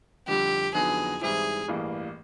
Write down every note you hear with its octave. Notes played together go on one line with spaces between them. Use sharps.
F2 D3 G3 G4
F2 D3 F#3 B3 D#4 G#4
G#2 E3 G3 C4 E4 G#4
A1 G2 E3 G3 A#3